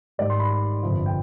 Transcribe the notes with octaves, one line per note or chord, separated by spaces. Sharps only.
G#1 G#2 D#3 G3 D5
C6
B5
B5
G1 F2 C3 F3
G5